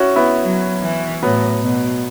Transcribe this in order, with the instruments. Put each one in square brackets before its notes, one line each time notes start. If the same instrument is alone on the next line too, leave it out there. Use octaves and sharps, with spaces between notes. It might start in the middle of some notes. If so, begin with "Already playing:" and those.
Already playing: [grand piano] C#4 E4 F#4
B3 E4
[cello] F#3
E3
[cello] A2 [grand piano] F#3 B3
[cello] B2